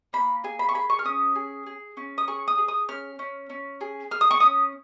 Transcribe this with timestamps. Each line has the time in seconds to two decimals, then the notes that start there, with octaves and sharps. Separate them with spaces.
0.13 A#3 B5
0.44 G#4 G#5
0.59 B5
0.69 C#6
0.74 G#4 B5
0.90 C#6
0.99 F6
1.05 C#4 D#6
1.35 G#4
1.66 G#4
1.97 C#4
2.18 D#6
2.28 G#4 C#6
2.48 D#6
2.58 G#4
2.68 D#6
2.89 C#4 F6
3.19 C#4
3.50 C#4
3.81 G#4
4.11 G#4 F6
4.21 D#6
4.31 C#6
4.40 C#4 D#6